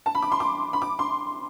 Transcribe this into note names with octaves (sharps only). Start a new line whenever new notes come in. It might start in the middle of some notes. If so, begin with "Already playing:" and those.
A5
B5
D6
C6
D6
B5
D6
C6